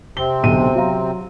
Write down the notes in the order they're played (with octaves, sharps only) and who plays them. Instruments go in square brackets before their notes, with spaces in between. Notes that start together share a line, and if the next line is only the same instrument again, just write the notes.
[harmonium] C3 C4 [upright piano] G7
[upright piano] B1 D3 D#7
F#3 F5 A#5